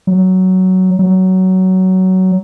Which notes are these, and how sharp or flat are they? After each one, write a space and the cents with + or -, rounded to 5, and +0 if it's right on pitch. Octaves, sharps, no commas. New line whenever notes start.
F#3 +10
F#3 +15